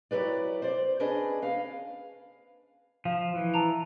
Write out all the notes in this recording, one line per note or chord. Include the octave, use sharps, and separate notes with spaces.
F#3 E4 G4 B4 D5
C5 D5
C#4 D4 G#4 B4 D#5
B4 F5
F3 F5
E3
A5 A#5 F7